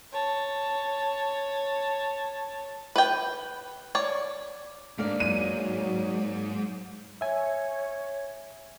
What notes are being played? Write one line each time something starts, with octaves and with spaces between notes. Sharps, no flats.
C#5 A5
B4 G5
C#5 D5
D#2 G#2 A#3 D4 D5
F#3 D#7
C#5 E5 G#5